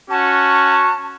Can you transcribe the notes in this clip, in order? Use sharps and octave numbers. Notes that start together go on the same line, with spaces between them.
C#4 F#4 A5